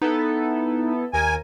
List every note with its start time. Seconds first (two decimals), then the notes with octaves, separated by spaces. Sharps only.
0.02 B3 D#4 E4 A4
1.13 D#2 A#4 G#5